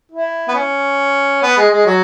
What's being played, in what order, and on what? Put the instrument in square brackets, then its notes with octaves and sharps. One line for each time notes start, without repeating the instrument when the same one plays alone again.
[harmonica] E4
B3
C#4
B3
G#3
G#3
F#3